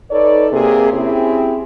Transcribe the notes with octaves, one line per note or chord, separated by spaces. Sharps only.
D#4 A4 B4 C#5 D5
C3 A#3 G#4
C4 C#4 E4 G4 G#4